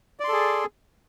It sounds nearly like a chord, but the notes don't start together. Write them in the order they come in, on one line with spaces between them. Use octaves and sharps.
D5 C6 A4 G#4